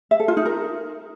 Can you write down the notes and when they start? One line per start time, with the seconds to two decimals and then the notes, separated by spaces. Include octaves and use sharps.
0.11 E5
0.20 A4
0.28 F4
0.37 D#4
0.45 A#4